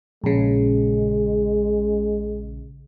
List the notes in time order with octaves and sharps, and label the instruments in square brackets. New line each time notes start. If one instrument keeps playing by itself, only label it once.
[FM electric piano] A#1 C#3 [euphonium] G#3